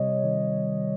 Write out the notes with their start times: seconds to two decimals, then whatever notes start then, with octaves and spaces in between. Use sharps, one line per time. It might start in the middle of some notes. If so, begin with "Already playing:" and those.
Already playing: C3 G3 C#5 D#5
0.24 D#3